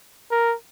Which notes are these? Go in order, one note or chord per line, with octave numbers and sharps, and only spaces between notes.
A#4